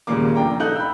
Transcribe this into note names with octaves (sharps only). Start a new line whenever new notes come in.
D#1 G#1 A#2 C#3 A#3 D6
F1 D4 G5 A#5
D#4 A4 F5 F#6 G6 F#7
B5 E6